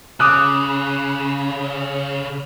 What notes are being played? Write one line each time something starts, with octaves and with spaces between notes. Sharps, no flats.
C#3 D6 D#6 F#6